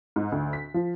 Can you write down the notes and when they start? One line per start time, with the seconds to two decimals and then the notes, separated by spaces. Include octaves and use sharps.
0.16 G#2
0.32 D2
0.53 B6
0.74 F3